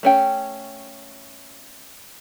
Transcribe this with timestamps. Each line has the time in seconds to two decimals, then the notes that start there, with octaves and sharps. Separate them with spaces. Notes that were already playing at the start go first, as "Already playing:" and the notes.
0.03 A3 C#4 G5